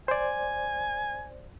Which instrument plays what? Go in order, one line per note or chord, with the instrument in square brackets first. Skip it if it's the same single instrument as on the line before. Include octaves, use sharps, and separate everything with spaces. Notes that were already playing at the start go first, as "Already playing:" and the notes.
[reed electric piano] C5 D5 [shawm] G#5